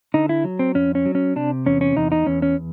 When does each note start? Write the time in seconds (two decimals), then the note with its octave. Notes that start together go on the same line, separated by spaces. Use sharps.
0.14 D3 D#4
0.29 E4
0.44 F#3
0.59 C4
0.75 F2 C#4
0.95 C#4
1.06 F#3
1.15 C#4
1.36 C3 D4
1.66 E2 C#4
1.81 C#4
1.97 E2 D#4
2.12 D#4
2.27 E2 C#4
2.42 C#4